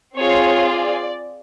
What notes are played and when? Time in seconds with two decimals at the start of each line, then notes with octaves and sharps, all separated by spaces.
0.15 C4 F4 G#4 C#5
0.69 D5